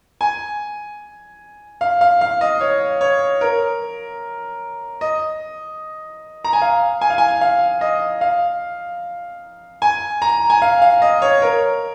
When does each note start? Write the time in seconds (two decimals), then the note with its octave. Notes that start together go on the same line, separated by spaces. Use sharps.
0.21 G#5
1.81 F5
2.01 F5
2.21 F5
2.41 D#5
2.61 C#5
3.01 C#5
3.41 A#4
5.01 D#5
6.44 A#5
6.53 G#5
6.62 F5
7.01 G#5
7.10 F5
7.18 G#5
7.41 F5
7.81 D#5
8.21 F5
9.82 G#5
10.22 A#5
10.50 G#5
10.62 F5
10.82 F5
11.02 D#5
11.22 C#5
11.42 A#4